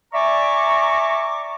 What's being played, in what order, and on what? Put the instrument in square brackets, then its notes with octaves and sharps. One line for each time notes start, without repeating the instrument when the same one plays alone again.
[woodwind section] D5 E5 G#5 A#5 C#6 D6